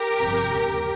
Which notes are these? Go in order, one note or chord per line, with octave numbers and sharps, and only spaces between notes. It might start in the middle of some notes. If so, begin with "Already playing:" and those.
Already playing: G4 A#4
G1 F2 C3
D#2 C#3